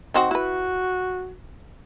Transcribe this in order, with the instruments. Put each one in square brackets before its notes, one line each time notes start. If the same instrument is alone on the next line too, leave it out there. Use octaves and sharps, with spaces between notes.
[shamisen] D#3 C4 F#4
[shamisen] E4 B4 [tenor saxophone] F#4